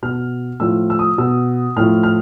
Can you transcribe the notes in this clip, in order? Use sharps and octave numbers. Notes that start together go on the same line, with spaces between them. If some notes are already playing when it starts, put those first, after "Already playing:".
B2 F6
A2 F3 E6
E6
D#6
B2 E6
A2 F3 F6
F6